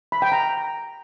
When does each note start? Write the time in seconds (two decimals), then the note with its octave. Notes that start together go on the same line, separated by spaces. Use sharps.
0.12 B5
0.22 G5
0.32 A#5